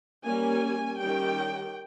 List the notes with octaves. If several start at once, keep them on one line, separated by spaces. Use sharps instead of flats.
G3 A#3 C#4 G#5
D#3 G3 C#4 G5